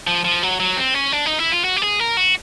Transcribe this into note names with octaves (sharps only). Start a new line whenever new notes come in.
F3
F3
F#3
F#3
C4
C#4
D4
D#4
E4
F4
F#4
G4
G#4
A#4
F#4